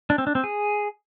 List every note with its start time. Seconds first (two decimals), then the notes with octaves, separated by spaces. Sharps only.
0.10 D4
0.18 C4
0.27 D4
0.35 C4
0.44 G#4